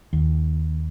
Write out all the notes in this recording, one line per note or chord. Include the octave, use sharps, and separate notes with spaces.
D#2